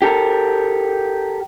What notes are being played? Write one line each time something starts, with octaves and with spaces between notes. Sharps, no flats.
G4 A4 A#4